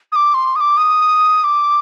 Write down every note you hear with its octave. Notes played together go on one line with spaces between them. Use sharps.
D#6
D6
C6
D#6
D6
D#6
D6